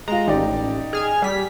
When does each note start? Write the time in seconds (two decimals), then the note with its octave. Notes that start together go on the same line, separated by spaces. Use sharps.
0.08 G#3 F4 A#5
0.28 A1 D#4 G4 D5
0.93 G#4 F6 G#6
1.22 G3 B6